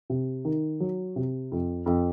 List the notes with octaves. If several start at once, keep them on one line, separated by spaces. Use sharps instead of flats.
C3
D#3
F#3
C3
F2
F2